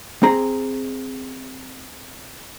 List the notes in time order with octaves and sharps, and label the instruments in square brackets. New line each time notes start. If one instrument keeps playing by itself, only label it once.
[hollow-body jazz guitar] C4 G#4 A#5